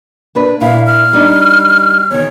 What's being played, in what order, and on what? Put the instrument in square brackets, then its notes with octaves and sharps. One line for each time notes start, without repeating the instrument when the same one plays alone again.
[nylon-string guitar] A#3 D4 B4
[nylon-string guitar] A#2 E4 [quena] F5
[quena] F6
[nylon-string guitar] G3 D4 D#4
[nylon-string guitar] E2 D#3 [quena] C#5